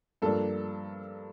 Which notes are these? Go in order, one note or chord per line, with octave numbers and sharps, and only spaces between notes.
G2 F3 A#3 D4 A4